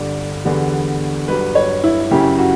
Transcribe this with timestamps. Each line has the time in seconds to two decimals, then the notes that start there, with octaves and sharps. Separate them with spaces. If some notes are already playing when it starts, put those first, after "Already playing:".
Already playing: G1 G2 D3 D5
0.45 E2 D3 G3 B3
1.28 G1 G2 F#3 B4
1.55 C#5
1.84 E4
2.11 F#2 C#3 F#3 C#4 E4 G4
2.39 F#4